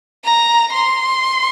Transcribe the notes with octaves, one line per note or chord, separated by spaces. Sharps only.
A#5
C6